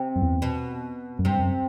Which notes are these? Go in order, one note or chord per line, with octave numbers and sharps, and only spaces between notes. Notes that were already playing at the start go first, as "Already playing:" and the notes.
Already playing: C3
F#2
E2
B2
F#2
G2 C3
F#2